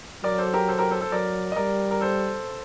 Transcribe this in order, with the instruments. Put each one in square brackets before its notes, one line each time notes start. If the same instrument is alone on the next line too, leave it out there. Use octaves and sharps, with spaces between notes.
[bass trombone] F#3 [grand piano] A#4 D5
[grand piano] A4 C5
G4 A#4
A4 C5
G4 A#4
A4 C5
A4 C5
[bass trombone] F#3 [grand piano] A#4 D5
[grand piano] D#5
[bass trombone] G3 [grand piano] A#4 D5
[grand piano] A#4
A4 C5